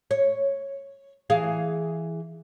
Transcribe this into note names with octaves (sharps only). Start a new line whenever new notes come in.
C#5
E3 G#4 F5